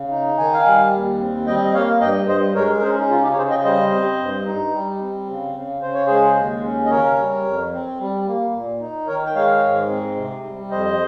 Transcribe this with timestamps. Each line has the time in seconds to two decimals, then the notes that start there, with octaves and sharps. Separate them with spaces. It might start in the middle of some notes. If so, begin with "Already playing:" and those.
Already playing: C#3
0.11 D#4
0.38 D#3 G#5
0.53 F5 G#5
0.65 G3
0.92 D#2
1.19 C4
1.47 G3 D#5 G5
1.65 D#5
1.74 A#3 C#5 F5
2.00 G2 D#5 G5
2.28 G2 C5 D#5
2.55 G#3 A#4 C#5
2.78 A#4
2.82 C#4 G#4 C5
2.99 D#4
3.10 C#3 F4
3.23 D#4 G4
3.33 C#5
3.37 C#3 G#4 C5
3.50 D#5 G5
3.64 G3 C5 D#5
3.91 C4
4.18 G2
4.46 D#4
4.72 G3
5.00 C4
5.27 C#3
5.54 C#3
5.82 C#3 C5
5.94 C#5
6.07 G#3 G#4 C5
6.36 D#2
6.63 C#4
6.86 D#5
6.90 C#3 A#4 C#5
7.18 G3
7.45 F2
7.72 C4
7.99 G3
8.26 A#3
8.53 A#2
8.80 D#4
9.07 D#3 A#4 C#5
9.26 G5
9.35 G#3 C#5 F5
9.62 G#2
9.89 C4
10.16 C3
10.44 G3
10.71 F2 C5 D#5